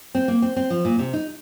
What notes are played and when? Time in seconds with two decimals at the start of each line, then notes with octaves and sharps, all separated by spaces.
0.15 C4
0.28 A#3
0.42 C4
0.57 C4
0.70 F3
0.85 A#2
0.99 C3
1.13 D#4